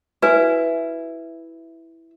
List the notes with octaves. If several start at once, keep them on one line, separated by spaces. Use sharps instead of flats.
E4 F#4 B4 E5 G#5